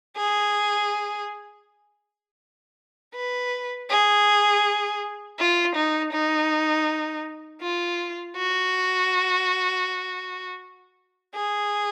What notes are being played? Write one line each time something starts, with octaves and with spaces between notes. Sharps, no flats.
G#4
B4
G#4
F4
D#4
D#4
F4
F#4
G#4